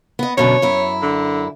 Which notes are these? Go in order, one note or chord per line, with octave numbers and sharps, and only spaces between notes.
B3 D#5
F#2 B2 D3 C#5
F#2 E4
D3